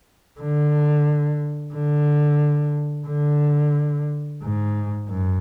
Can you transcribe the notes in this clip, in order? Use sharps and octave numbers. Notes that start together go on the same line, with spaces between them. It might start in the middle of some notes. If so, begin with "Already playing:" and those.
D3
D3
D3
G#2
F#2